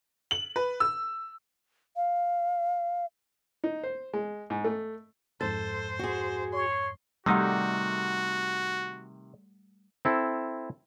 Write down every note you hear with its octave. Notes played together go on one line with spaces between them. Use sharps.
F#7
B4
E6
F5
D#4
C5
G#3
G#2
A3
F2 G#2 A4 C5 A6
F#4 G#4
C#5 C6
C3 D#3 G3 A3 D#4 F#4 F#5
C4 E4 A4